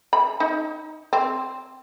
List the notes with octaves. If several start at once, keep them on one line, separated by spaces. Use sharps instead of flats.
B5
D#4
C4